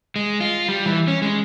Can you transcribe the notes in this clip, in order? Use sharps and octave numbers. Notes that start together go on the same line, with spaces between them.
G#3
F4
G3
E3
C#4
G#3